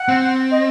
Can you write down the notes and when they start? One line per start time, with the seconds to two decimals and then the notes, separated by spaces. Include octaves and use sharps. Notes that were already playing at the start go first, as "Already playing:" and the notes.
Already playing: F#5
0.08 C4
0.51 D#5